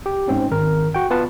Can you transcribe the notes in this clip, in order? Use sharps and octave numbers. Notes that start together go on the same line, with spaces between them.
G4
G#2 C4 C#4
G#1 A#4
F#4 G5
B3 F4 B4 F#5 A5